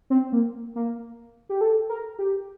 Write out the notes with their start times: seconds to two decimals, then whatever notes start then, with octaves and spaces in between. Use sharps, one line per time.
0.10 C4
0.32 A#3
0.76 A#3
1.49 G4
1.61 A4
1.89 A#4
2.19 G4